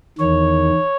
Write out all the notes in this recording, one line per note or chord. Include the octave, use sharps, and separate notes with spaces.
E2 D#3 C#5